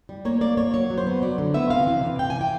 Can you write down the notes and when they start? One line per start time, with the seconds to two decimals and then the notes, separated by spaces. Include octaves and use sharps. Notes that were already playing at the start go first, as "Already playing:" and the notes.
0.09 G3
0.25 A#3 C#5
0.41 A#3 D5
0.57 A#3 C#5
0.73 F#3 C#5
0.90 F#3
0.98 C5
1.07 B3
1.22 F#3 D5
1.38 D3
1.54 B3 E5
1.70 C3 F5
1.87 E3
2.03 C3
2.19 C3 G5
2.30 G#5
2.35 E3
2.41 G5